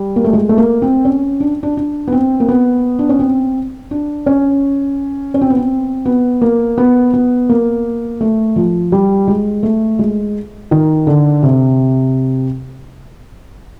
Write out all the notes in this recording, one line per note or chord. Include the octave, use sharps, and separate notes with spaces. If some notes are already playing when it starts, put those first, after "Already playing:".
Already playing: G3
A#3
A3
G#3
A3
A#3
C4
C#4
D4
D4
D4
B3
C4
A#3
B3
D4
C#4
C4
D4
C#4
C#4
C4
B3
C4
B3
A#3
B3
B3
A#3
A3
F3
G3
G#3
A3
G#3
D#3
D3
C3